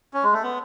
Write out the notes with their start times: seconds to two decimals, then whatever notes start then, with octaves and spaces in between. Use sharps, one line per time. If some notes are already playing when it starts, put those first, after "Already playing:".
0.14 C#4
0.23 G#3
0.33 A3
0.43 B3